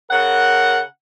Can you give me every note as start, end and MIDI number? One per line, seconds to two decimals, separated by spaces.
0.11 0.81 49
0.11 0.81 70
0.11 0.81 78